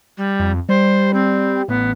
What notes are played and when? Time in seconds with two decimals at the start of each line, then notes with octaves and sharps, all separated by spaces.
0.18 G3
0.40 F2
0.69 G3 C5
1.14 C4
1.68 A1 B3